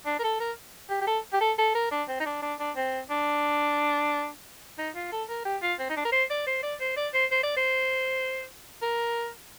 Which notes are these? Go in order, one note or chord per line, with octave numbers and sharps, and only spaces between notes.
D4
A#4
A4
A#4
G4
G4
A4
G4
A4
A4
A#4
D4
C4
D#4
D4
D4
D4
C4
D4
D#4
F4
A4
A#4
G4
F4
C4
D#4
D4
A#4
C5
D5
C5
D5
C5
D5
C5
C5
D5
C5
A#4